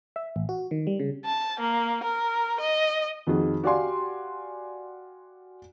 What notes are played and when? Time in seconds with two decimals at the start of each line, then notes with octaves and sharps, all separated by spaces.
0.16 E5
0.36 A1
0.49 F#4
0.71 D#3
0.87 G3
1.00 C#3
1.25 A5
1.60 A#3
2.04 A#4
2.60 D#5
3.27 F2 D#3 F#4 G#4
3.63 F#4 G4 D5 F5 G#5 C6